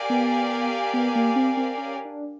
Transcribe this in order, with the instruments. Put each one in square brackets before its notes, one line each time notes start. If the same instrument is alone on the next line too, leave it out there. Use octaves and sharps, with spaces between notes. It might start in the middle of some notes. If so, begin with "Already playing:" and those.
Already playing: [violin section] G4 A#4 D5 F5 G#5
[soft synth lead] B3
B3
A#3
C4
C4
C#4
D4